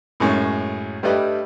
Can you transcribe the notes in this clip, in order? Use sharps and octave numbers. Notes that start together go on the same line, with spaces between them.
F#2 A2 G#3 C#4
G2 G3 A3 B4 D5 D#5